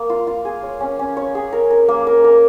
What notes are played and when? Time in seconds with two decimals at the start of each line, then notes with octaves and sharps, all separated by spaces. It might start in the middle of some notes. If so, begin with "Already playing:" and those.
Already playing: A#3
0.10 F4
0.27 F4
0.45 G#4
0.63 C#5
0.80 C#4
0.99 C#4
1.17 C#5
1.35 G#4
1.52 A#4
1.71 A#4
1.88 A#3
2.07 A#4
2.24 A#4